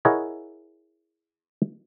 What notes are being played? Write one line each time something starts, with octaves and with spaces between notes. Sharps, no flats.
E4 G#4 A#4 C#5 D#5 F#5